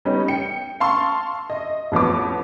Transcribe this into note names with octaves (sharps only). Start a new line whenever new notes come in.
G3 B3 C#4 D#4
G5 C#7
F5 A5 C6 C#6 E6
D#5 E5
A1 F2 B3 D6